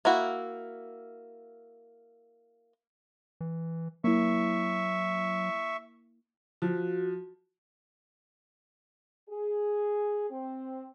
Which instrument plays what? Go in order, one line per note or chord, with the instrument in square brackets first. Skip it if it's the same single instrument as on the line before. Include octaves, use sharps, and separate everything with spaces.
[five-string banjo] A#3 E4 F#4
[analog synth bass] E3
[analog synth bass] F#3 [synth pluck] A#3 E4 [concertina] E5 C#6
[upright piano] F3 [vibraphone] F#4
[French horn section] G#4
C4